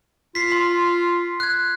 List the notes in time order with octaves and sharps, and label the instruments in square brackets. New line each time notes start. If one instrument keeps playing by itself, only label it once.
[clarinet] F4 [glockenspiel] B6 C7
[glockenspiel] C6
F#6 G#6